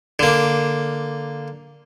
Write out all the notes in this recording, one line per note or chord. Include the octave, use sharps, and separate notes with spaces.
D3 A#3